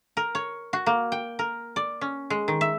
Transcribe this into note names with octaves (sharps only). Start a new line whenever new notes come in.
A#4
C#5
F#4
A#3
G5
A#4
D5
C#4
G#3
D#3
E5